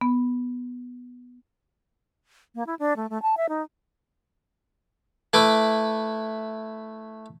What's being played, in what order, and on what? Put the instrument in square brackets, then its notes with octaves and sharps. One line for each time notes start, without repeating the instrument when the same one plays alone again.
[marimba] B3
[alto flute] A#3
E4
D4
A3
A3
A5
E5
D#4
[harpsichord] A3 E4 B4 D6